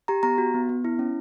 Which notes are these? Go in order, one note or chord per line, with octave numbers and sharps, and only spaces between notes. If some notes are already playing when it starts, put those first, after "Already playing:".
G4 A#5
B3 A#5
F#4
B3
B3
E4
C#4